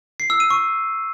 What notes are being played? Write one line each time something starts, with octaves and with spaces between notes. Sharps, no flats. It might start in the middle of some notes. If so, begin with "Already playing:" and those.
C7
E6
D#7
C#6